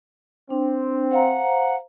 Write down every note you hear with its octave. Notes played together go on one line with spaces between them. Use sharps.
C4 D4
C5 F5 F#5 A#5